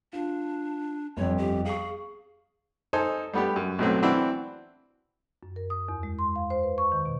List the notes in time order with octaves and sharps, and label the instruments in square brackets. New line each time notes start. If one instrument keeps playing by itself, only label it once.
[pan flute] D4 [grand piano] F4
[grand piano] G1 F2 [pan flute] C#5
[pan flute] G4
[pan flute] G#4 [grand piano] F5 C#6
[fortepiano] D#4 A4 C5 G#5
G3 A3 B3 D4 G4
F#2
B1 F#2 A2 F#3 A3 C4
E3 C4 D4 E4 F#4
[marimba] F#2
A#4
D#6
E2
G#3
C6
F5
C5
B4
C#6
D#3
B2